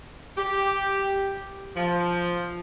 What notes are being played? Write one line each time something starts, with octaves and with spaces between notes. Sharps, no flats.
G4
F3